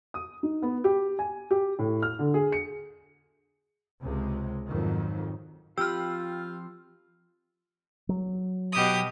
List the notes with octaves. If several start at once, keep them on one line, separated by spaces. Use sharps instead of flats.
D#6
D#4
B3
G4
G#5
G4
A2
F6
D3
G#4
C#7
C#2 C3 G#3
F2 G#2 D#3 F#3
F3 C4 F4 G4 B5 E6 F6
F#3
B2 G4 D#6